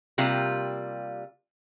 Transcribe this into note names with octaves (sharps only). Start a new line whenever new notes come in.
C3 G3 A#3 F4